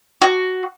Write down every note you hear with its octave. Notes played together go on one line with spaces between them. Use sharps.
F#4